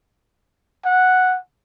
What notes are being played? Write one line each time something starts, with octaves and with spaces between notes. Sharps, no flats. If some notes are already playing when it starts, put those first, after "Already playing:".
F#5